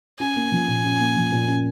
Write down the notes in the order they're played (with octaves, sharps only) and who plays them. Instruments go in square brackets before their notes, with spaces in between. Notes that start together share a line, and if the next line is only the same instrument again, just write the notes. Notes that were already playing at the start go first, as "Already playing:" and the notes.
[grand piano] C#4 [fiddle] G#5
[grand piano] A#3
F3
A#2
C#4
A#3
F3
A#2
C#4